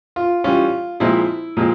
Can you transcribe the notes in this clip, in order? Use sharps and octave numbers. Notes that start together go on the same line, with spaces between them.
F4
E3 G3 C#4 F4
A#2 F3 G#3 C4 E4
A#2 F3 G#3 C4